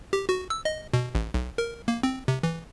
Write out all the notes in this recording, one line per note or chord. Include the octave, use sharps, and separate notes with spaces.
G4
F#4
E6
D#5
B2
A1
B1
A#4
A#3
C4
C3
E3